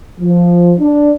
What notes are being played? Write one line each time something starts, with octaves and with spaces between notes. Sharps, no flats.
F3
D4